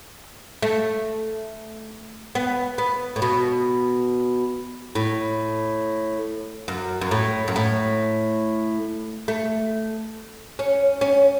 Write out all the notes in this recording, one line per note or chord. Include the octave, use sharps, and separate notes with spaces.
A3
B3
B3
A2
B2
A2
F#2
F#2
A2
F#2
A2
A3
C#4
C#4